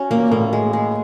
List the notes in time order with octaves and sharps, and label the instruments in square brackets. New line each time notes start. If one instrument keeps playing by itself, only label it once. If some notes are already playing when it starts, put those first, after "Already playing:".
Already playing: [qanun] C#4 F#4
[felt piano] A#2 [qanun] A#3
[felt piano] A2 [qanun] A#3
[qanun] G#3
G#3